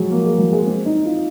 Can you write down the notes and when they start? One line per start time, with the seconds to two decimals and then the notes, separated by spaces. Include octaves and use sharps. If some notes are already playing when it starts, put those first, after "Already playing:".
Already playing: F3 F#3 G#3
0.11 A#3
0.25 G#3
0.39 F#3
0.53 G#3
0.66 C4
0.86 D#4
1.05 F4